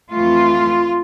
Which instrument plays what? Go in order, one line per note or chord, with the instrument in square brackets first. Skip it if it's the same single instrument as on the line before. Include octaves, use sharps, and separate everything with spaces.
[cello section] F2 E3 A3 F4